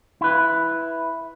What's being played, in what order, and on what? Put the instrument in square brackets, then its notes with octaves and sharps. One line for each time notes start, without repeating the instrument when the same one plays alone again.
[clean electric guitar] E4 B4